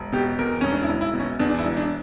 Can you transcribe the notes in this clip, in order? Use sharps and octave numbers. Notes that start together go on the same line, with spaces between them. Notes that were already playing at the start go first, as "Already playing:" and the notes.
Already playing: E1
B2 G4
E2 A#4
E1 C#4
D4
E4
E1
E4
B2
C#4
E2 D4
D4
E4
E1
D4